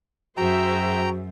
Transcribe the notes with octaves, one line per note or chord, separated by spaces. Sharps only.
F#2 F#4 G#4 C5 E5 G5 A#5